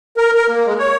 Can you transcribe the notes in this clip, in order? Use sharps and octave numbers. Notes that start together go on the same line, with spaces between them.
A#4
A#4
A#3
G#3
C#5